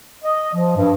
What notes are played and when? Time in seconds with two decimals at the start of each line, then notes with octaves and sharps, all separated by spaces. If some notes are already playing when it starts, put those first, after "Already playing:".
0.24 D#5
0.54 F3
0.77 G2